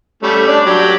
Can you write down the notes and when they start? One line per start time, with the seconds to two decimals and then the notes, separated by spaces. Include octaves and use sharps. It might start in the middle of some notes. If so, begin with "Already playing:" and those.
0.23 G3 A3 C#4
0.48 D4 D5
0.66 F#3 G4